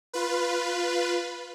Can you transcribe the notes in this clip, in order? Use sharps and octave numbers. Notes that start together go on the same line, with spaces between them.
F4 B4